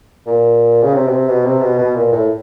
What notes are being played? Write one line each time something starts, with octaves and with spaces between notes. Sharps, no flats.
A#2
C#3
C3
B2
C3
B2
C3
B2
B2
A#2
A2